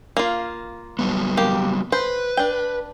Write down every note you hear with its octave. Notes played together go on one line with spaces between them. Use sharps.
A#3 F4
F#3 G3 B3
A#3 G4
B4 C5
D4 G5